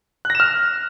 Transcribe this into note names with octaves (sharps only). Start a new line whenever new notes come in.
F6 F#6 A#6 E7